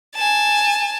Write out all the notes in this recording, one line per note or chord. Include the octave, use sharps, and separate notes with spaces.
G#5 A5